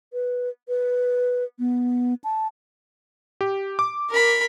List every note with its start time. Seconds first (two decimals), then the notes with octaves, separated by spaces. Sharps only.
0.13 B4
0.68 B4
1.59 B3
2.24 A5
3.41 G4
3.79 D6
4.10 A#4 B5